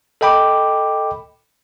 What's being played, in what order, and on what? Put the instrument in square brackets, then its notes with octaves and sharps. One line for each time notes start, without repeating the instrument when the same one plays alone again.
[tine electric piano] A4 D#5 G5 B5 D6